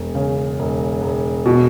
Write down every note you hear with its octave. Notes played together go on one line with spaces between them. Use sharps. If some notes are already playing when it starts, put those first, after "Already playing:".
Already playing: E1
C#3
E1
E1
B2